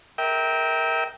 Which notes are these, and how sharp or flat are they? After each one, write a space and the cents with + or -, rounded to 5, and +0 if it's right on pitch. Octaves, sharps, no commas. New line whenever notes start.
A#4 +0 E5 -30 G5 +0